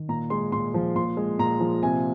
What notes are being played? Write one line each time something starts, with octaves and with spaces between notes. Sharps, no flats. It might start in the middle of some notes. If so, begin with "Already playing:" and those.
Already playing: D#3
A#2 A#5
G#3 C6
A#2 C6
F3
A#2 C6
G#3
A#2 A#5
F3
C3 G#5